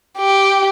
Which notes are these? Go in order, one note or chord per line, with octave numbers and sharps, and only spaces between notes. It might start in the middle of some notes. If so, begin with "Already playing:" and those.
G4